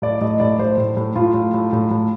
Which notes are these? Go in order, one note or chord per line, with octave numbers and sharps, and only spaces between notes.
A2 D5
A2 D#5
A2 D5
A2 C5
A2
A2
A2 F4
A2
A2
A2
A2